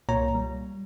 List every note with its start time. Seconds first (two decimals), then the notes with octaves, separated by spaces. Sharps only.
0.09 C2 A#2 A#3 C#5 A#5
0.35 G3